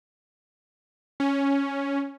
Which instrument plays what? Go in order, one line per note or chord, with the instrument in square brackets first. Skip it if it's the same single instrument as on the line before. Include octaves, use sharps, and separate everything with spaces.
[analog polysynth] C#4